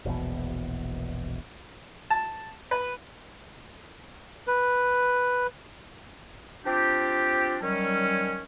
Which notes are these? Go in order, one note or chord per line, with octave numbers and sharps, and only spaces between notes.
E1 A#1 E2 B2
A5
B4
B4
C4 D4 F4 G4
D#3 F#3 G3 C#4